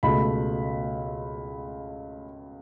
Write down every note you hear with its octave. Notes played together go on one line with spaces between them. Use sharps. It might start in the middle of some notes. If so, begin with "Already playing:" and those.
C#2 B2 A3 B5